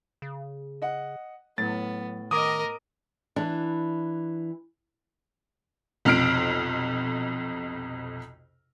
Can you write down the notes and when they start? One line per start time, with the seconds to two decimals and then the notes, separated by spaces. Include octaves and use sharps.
0.22 C#3
0.82 D#5 F#5
1.58 A2 F#3 B3 A6
2.31 D#3 A#4 D#5 D6 D#6
3.36 E3 D4
6.05 B1 F2 C3 F6 C7 D7